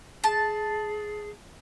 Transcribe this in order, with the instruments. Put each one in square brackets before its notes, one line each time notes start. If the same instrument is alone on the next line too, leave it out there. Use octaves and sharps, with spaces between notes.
[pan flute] G#4 [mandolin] A5